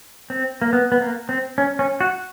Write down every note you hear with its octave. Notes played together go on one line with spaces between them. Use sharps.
C4
A#3
B3
B3
A#3
C4
C#4
C#4
F#4